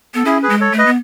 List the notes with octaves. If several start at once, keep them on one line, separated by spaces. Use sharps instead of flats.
B3 A4
C#4 E4 G#4
G#4 B4
G#3
A4 C#5
A3
B4 D#5
B3